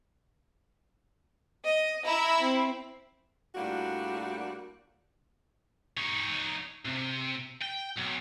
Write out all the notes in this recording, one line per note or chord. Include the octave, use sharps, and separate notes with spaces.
D#5
E4 A#5 E6
C4
A2 G3 A#3 D4 F4 F#4
D#4 C#5
C3
G5
B1